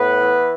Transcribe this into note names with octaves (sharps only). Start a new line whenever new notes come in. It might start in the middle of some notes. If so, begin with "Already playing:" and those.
Already playing: A2 B3 B4
E3